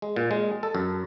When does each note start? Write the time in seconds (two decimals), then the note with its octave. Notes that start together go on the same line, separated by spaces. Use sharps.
0.02 G#3
0.16 A#2
0.31 G#3
0.63 A4
0.75 F#2